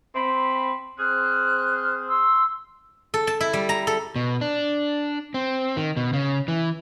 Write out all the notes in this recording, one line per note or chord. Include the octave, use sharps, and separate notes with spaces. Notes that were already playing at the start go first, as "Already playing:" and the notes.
C4 B5
C4 G#4 C5 F6 F#6
C6 E6
A4
A5
E4
G3
A#5
A4
B2
D4
C4
D#3
B2
C#3
E3